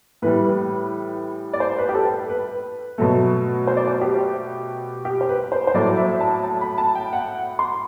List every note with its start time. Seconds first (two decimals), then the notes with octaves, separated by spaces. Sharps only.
0.22 A2 E3 G3 B4
1.53 D5
1.60 C5
1.78 B4
1.89 G4
1.94 A4
2.30 B4
2.98 B2 F#3 A3
3.67 C5
3.77 D5
3.88 C5
4.01 G4
5.05 G4
5.21 C5
5.29 B4
5.52 C5
5.67 C5
5.74 A2 F#3 A3 D5
5.97 E5
6.21 A5
6.44 A5
6.61 B5
6.78 A5
6.95 G5
7.13 F#5
7.59 C6